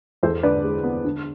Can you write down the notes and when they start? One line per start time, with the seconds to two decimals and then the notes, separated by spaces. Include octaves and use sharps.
0.23 E2 A4 C5
0.43 D3 B4 D5
0.64 G#3
0.84 B3
1.04 D3